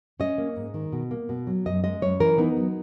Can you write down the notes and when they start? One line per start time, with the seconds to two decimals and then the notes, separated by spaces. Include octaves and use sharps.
0.20 C#4 D#5
0.38 A#3
0.57 G#2
0.74 D#3
0.92 B2
1.11 A#3
1.29 B2
1.47 F#3
1.66 F#2 D#5
1.84 G#3 D#5
2.01 F#2 C#5
2.20 E3 A#4
2.38 B3 D#4
2.57 F#3